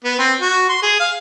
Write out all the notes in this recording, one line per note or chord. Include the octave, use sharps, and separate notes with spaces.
B3
C4
F#4
C6
G#4
F5